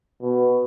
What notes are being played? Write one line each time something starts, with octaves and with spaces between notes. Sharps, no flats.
B2